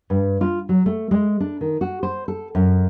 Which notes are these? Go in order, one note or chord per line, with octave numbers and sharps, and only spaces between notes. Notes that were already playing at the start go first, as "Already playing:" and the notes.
G2
F4
F#3
A3
G#3
D4
D#3
F#4
C5
A4
F#2